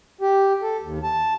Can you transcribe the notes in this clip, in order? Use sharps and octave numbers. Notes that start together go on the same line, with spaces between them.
G4
A4
D#2
A5